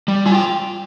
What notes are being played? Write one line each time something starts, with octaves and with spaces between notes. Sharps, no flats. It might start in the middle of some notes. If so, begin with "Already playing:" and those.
G3
F4 G#5
G5